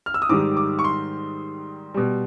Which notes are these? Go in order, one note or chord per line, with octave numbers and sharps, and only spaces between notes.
F6
E6
D#6
G#2 D#3 G3 D6
D6
C#6
C6
B2 G3